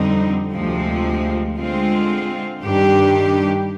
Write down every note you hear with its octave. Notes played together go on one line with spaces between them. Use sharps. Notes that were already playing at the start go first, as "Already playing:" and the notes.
Already playing: F2 D3 G3 C4 D#4
D2 C3 F3 G#3 C4
D3 G#3 C4 F4
G2 D#3 G3 D4 G4